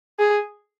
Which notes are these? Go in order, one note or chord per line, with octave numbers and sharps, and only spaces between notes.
G#4